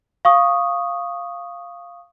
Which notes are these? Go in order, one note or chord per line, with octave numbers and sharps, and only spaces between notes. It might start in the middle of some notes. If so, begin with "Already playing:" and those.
F5 C#6 D#6